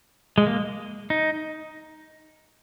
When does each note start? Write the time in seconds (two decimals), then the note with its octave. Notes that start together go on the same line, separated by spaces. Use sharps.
0.38 G#3
0.47 A#3
1.10 D#4